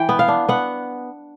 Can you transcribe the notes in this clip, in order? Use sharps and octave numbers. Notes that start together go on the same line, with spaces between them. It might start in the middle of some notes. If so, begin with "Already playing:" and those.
Already playing: E3 G5
B3
F5
D4
B3 F#5